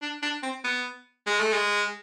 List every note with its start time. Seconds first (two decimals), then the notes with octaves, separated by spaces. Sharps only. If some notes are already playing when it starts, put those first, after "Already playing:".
0.02 D4
0.22 D4
0.43 C4
0.64 B3
1.27 G#3
1.39 A3
1.52 G#3